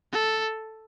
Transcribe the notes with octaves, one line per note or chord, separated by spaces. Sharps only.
A4